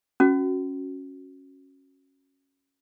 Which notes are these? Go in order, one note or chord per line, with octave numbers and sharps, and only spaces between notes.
C#4 F#4